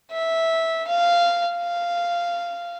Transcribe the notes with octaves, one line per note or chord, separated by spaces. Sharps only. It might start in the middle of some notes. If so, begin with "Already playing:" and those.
E5
F5
F5